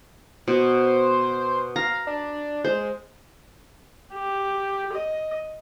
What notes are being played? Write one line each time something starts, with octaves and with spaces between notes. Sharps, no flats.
B2 C5
F5 A#5
D4
G#3 C5
G4
D#5